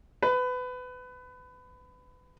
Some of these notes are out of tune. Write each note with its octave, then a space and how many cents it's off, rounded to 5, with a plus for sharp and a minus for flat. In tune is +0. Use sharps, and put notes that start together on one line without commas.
B4 +25